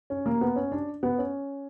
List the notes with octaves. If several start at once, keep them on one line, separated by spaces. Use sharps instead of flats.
C#4
A#3
B3
C#4
D4
B3
C#4